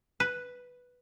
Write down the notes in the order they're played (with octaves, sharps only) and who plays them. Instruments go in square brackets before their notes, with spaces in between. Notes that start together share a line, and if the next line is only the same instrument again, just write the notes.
[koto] B4